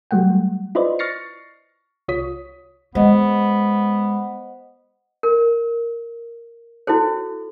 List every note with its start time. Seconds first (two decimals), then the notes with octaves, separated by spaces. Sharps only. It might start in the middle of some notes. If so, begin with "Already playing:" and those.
0.11 F#3 G3 A3 F#5 G5
0.75 E4 F4 B4 C5 D5 D#5
0.99 C#6 F6 A6 A#6 C7 C#7
2.08 C2 F4 C#5 D#6 B6
2.95 G#3 B3 C5 D#5 F#5
5.23 A#4
6.87 E4 F#4 A4 C5